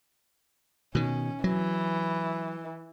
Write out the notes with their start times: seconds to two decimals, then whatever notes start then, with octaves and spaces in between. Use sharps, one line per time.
0.95 B2 D#3 C#4
1.44 E3 F#3